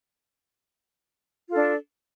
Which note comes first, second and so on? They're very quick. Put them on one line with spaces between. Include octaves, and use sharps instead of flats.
F4 A4 D4